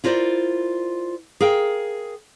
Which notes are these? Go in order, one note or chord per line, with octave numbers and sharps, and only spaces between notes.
E4 F4 A#4 C5 D5
G#4 A#4 F5 G5